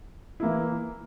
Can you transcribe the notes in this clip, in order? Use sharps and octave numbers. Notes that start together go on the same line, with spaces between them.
E3 A#3 E4